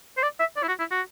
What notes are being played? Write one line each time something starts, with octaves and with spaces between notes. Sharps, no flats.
C5
D5
E5
D5
E4
F#4
E4
F#4